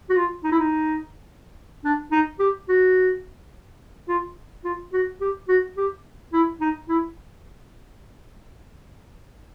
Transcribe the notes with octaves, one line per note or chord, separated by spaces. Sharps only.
F#4
F4
D#4
E4
D#4
D4
D#4
G4
F#4
F4
F4
F#4
G4
F#4
G4
E4
D#4
E4